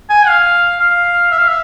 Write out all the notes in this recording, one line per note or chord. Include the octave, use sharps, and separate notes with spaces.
G#5
F5
F5
E5
F5
E5